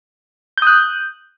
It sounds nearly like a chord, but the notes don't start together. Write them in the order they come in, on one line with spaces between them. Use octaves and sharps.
G6 D#6 F#6